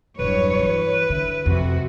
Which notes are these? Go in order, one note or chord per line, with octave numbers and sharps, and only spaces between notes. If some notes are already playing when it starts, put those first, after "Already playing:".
E1 G2 F#3 B4 C#5
E3
D3 E4
F2 C3 F#4